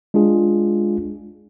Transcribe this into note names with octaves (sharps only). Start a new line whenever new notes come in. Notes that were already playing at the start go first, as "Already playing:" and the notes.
G#3 D4 F4 G#4